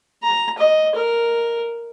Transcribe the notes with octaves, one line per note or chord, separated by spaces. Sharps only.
A#5
D#5
A#4